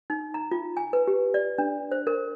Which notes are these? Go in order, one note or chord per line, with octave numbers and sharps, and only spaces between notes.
D#4
A#5
F4
G#5
B4
G4
D5
D4
C5
A#4